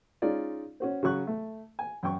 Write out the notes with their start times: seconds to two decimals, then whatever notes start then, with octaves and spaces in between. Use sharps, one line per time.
0.22 G#3 C#4 D#4 F4 G#4 D5
0.80 C#4 F#4 C5
1.03 C#3 F#3 C#6 F#6
1.27 A3
1.79 G#5
2.03 F#2 G5 C#6